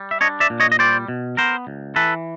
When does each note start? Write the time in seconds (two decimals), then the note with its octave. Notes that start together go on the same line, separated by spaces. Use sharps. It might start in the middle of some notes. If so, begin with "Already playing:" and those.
Already playing: G3
0.11 E5
0.21 D4 C#5 D#5
0.40 D5 E5
0.50 A#2
0.60 C#5 D#5
0.72 D#5
0.79 G3 C5 D5
1.08 B2
1.37 B3 A#4 C5
1.67 C#2
1.96 E3 A4 B4